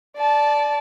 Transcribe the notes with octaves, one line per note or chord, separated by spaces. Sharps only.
D5 A5